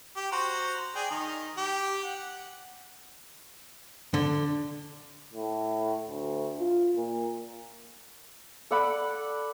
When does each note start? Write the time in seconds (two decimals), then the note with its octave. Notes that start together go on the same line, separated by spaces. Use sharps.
0.16 G4
0.32 F#4 C5 A#5
0.95 G#4 D5 G5
1.11 D#3 D#4
1.57 G4
2.03 F#5
4.14 D3
5.33 A2
6.09 D2
6.59 F4
6.96 A#2
8.71 A4 D5 F#5 B5